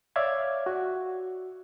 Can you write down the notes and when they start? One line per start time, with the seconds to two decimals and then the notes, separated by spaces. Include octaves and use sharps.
0.16 C#5 D5 E5 F5 G#6
0.66 F#4